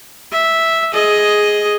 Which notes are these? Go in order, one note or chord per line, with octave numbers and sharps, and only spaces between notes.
E5
G#4 D#5